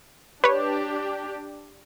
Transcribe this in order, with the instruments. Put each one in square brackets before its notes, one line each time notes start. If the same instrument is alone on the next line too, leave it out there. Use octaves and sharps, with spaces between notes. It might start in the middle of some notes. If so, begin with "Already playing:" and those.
[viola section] D4 G4 [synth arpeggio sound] B4 C#5